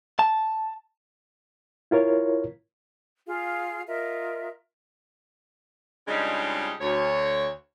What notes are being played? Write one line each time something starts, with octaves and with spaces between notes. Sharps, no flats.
A5
E4 F4 A#4 C#5
F4 G#4 F5
F4 A#4 D#5 E5
C#3 F3 G3 G#3 D4 D#4
D2 C#5